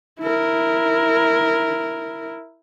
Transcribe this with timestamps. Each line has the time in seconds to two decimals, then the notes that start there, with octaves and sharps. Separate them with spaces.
0.20 E4 A#4